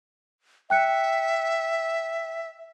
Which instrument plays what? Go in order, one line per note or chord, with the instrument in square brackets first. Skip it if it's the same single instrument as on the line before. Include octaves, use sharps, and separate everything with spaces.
[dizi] E5 [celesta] G5 F#6 C#7